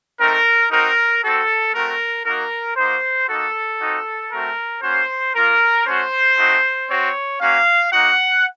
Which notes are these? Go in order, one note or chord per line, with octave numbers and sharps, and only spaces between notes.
A3 C4 D#4 A#4
C4 D#4 F#4 A#4
C4 F#4 A4
A3 C4 F#4 A#4
A#3 D#4 F#4 A#4
A#3 D#4 F#4 C5
A#3 D#4 F#4 A4
C4 D#4 F#4
A3 C4 F#4 A#4
A#3 C#4 F#4 C5
A#3 F4 A#4
A3 C#4 F#4 C5
A3 C4 D#4 F#4
C4 F#4 C#5
A#3 C#4 F#4 F5
A#3 D#4 F#4 F#5